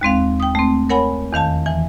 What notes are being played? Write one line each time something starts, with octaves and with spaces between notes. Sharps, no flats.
D#2 G#3 C4 F5
G5 D#6
A3 C4
A#4 C#5 F#5 G#5 B5
E2 D#3 F5 A5
E3 G#5